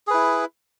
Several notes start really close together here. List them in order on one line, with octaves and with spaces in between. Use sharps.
G#4 B4 E4